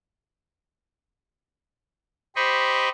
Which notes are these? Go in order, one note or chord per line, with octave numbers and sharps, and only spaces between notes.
G4 C5 D#5 B5 C#6